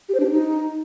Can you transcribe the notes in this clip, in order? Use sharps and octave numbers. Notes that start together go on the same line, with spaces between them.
G4
C5
D4
G4
D#4